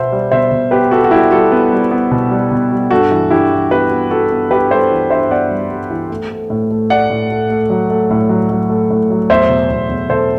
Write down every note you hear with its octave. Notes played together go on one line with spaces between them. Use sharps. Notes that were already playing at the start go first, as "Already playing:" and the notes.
Already playing: B2 B3 C5 E5
G3
B2 C5 E5
B2
B3 G4 B4
B3 F#4 A4
F#4
G3 E4 G4
G3 F#4 A4
B3
G3
B3
B2
G3
B2
G3
G2 F#4 A4
E3
G2 E4 G4
E3
B3 G4 B4
B3
B3 F#4 A4
B3
G2 G4 B4
G3 A4 C5
E3
G2 C5 E5
B3 D5 F#5
G3
G3
E3
A3
A3
A2
A3
A3 D5 F#5
A2
A3
A3
F#3
A3
A2
F#3
F#3
A3
A2
F#3
E2 C5 E5
B2
E2
E2
B2 A4 C5